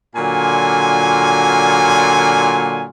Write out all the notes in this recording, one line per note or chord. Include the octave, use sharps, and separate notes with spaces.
A#2 D3 F#3 F4 G#5